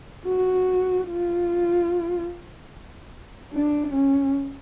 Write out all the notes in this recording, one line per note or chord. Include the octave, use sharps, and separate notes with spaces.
F#4
F4
D4
C#4